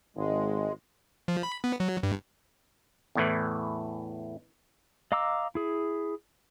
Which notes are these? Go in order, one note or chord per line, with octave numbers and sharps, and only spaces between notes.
G#1 G#3
F3
B5
B3
F#3
G2
E2 A2 E3
D#5 F5 A#5 D6 E6
E4 G#4